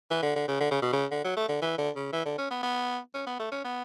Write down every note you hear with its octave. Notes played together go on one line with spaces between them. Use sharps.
E3
D3
D3
C#3
D3
C#3
B2
C#3
D3
F#3
A3
D3
E3
D3
C#3
E3
D3
C#4
B3
B3
C#4
B3
A3
C#4
B3